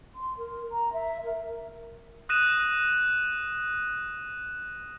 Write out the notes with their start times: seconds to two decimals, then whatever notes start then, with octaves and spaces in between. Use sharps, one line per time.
0.15 C6
0.38 A#4
0.72 A#5
0.93 E5
1.24 A#4
2.29 D#6 F#6 A#6 D#7 E7